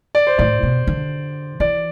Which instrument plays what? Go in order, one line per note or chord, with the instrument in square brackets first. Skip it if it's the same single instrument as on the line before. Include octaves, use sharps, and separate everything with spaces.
[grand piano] D5
C5
[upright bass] A2 [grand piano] D5
[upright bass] B2
D3
[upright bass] E3 [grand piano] D5